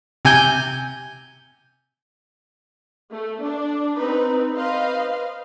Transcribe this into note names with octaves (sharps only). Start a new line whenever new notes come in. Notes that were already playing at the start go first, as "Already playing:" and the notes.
C3 G#5 G6
A3
D4
C4 D#4 B4
B4 C5 D#5 F5